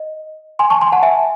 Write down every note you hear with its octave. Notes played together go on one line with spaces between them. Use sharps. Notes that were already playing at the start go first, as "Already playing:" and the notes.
Already playing: D#5
G#5 C6
A5 C#6
G#5 C6
F#5 A5
E5 G#5